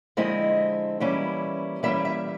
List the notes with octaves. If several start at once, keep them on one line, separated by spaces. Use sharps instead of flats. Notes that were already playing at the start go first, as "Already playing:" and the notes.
D3 F3 G#3 C4 E4 D#5
E3 G3 A#3 C#4 E4
E3 G3 A#3 C#4 E4 E5
E5